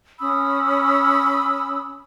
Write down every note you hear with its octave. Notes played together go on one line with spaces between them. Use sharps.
C#4 B5 D#6 E6